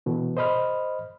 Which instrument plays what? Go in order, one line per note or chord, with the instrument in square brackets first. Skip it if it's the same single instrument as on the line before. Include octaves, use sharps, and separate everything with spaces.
[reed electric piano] B2 E3
C5 D#5 B5 F6